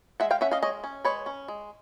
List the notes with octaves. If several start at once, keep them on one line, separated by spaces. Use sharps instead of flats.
G#3 E5 F#5
F5 G5
C#4 E5 F#5
D#5 F5
G#3 C#5 D#5
C#4
G#3 B4 C#5
C#4
G#3